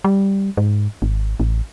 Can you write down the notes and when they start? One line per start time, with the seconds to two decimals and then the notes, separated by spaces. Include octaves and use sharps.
0.04 G3
0.57 G#2
1.02 G#1
1.40 A1